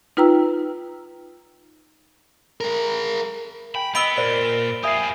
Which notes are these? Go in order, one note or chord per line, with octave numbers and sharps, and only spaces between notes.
D#4 F4 B4 G5 A#5 E6
G#3 A#4
G5 G#5 B5
B3 D#5 G5 B5 E6 D7 G7
A#2 A#4 C5 D5
G4 E5 F5 G#5 D#6